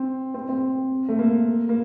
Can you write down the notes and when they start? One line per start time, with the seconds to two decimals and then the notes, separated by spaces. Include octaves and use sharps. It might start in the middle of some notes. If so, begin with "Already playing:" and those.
Already playing: C4
0.34 C4
0.49 C4
1.09 A3
1.19 A#3
1.69 A#3